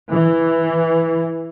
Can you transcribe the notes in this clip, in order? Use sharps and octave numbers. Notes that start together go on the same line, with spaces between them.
E3